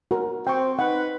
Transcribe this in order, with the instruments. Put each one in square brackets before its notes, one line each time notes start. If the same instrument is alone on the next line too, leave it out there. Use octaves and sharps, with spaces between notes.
[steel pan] F#4 A#4
[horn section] C4 [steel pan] G5 C#6
[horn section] D#4 B4 [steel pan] F#5